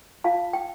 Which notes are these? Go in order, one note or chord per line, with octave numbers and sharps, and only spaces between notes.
F4 F5 A5
G5